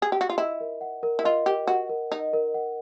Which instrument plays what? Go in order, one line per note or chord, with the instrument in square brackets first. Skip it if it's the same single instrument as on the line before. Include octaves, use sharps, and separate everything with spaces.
[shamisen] G#4
G4
F#4
F4
[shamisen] E4 [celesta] D#5
[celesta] A#4
F#5
A#4
[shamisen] E4
[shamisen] F4 [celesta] D#5
[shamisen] G4 [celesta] A#4
[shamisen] F#4 [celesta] F#5
[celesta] A#4
[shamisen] D#4 [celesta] D#5
[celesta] A#4
F#5